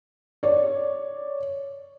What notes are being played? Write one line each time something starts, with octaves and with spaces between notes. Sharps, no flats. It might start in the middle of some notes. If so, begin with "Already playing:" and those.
C#5 D5